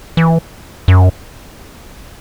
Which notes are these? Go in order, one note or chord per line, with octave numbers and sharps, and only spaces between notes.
E3
F#2